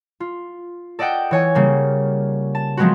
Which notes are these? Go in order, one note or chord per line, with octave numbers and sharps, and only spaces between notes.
F4
A4 D5 D#5 F#5 G5
E3 C#5 G#5
C#3 G3 A#3
A5
F3 F#3 G#3 B3 C4 F#4